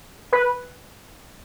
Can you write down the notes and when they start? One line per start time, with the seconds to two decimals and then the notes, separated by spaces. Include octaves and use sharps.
0.32 B4